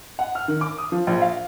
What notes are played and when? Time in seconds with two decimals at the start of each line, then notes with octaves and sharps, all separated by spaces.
0.19 F#5
0.35 F6
0.48 D#3
0.61 D6
0.78 D#6
0.92 F3
1.07 A#1
1.22 F5